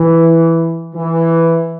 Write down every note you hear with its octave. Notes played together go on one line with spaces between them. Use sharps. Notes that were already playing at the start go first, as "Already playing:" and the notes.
Already playing: E3
E3